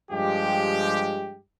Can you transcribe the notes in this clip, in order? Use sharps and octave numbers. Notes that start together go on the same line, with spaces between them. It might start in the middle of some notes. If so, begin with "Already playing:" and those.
G2 F3 G#3 G4